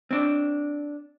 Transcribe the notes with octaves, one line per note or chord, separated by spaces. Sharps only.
C4 D4